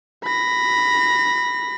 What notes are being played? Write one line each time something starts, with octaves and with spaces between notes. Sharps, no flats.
B5 A#6